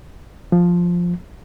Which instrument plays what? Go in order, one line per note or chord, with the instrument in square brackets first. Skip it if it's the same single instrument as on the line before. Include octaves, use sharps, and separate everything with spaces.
[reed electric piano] F3